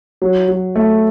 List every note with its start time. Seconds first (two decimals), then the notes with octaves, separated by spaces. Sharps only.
0.22 F#3
0.49 F#3
0.76 A3